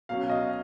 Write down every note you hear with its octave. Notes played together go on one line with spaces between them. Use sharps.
B2 F#3 C#4 F5
D#5